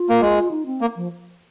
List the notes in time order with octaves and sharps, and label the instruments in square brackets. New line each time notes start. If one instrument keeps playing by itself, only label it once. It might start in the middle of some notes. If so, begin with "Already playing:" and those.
Already playing: [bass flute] F4
[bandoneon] A#3
G#3
[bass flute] D#4
C4
[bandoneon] A#3
[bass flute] F3